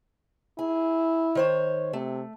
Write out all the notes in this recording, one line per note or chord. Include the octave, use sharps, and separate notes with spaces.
E4 G#4
D#3 C5 C#5
C3 A3